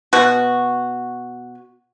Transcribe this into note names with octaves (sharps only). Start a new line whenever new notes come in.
B2 F#4